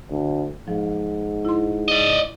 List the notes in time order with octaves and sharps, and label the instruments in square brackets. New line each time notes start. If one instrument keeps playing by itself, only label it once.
[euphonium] D2
[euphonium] G#2 [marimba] F3
[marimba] E4 C6
[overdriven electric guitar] D5 D#5